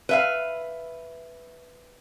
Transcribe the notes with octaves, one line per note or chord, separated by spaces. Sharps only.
B4 E5 F5